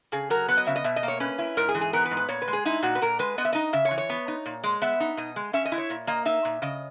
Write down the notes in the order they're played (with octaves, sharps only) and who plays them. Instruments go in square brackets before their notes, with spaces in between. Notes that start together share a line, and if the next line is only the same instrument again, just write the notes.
[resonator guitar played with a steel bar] C#3 G#4
F#3 A#4
B3 B4
D#5
C#3 E5
D#5
B2 E5
D#5
A#3
C#5
C#4 B4
E4
G#2 A#4
G#4
E3
G#4
B3 A#4
B4
G#2
B4
A#2 C#5
B4
G#3
G#4
D#4 E4
A#2 F#4
B4
A#2 A#4
G#3 B4
B3 D#5
E5
D#4 D#5
C#3 E5
C#5
E3
C#5
B3
D#4
A#2
G#3
B3 E5
D#4
B2 D#5
G#3
C#4 E5
D#5
E4
C#5
A#2
A#3 D#5
D#4 E5
A#2
C#3 D#5